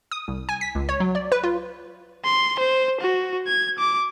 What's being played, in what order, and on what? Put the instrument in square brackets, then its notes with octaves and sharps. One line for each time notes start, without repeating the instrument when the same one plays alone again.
[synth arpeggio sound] D#6
C2
G#5
B6
C#2
C#5
F#3
D5
B4
F4
[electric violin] C6
C5
F#4
G#6
D6